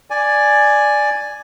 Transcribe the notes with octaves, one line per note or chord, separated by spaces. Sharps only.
D5 G#5